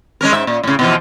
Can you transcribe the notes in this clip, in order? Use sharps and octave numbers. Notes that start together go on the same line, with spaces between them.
G#3 C#4 A#4
G#2 E5
A#2
A2 C#3
B2 E3 F3